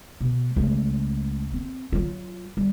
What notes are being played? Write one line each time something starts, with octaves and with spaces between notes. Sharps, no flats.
B2
C#2 A3
C4
F#3 F4
G3